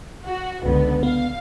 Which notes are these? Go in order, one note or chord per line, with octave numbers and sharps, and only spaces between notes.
F#4
C#2 D3 B3
B3 F5